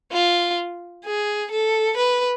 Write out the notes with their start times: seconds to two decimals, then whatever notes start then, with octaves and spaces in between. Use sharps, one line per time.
0.12 F4
1.05 G#4
1.51 A4
1.97 B4